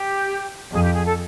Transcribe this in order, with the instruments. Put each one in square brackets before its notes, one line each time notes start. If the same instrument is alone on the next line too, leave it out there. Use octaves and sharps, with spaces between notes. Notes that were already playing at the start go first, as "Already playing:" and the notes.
Already playing: [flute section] G4
[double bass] F2 [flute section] G#4
[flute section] G4
G#4
A4